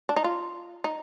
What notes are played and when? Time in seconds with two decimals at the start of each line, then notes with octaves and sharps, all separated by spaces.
0.09 D4
0.16 D#4
0.24 F4
0.84 D#4